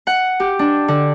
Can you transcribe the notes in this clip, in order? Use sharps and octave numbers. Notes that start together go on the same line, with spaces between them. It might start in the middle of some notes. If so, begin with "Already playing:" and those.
F#5
G4
D4
D3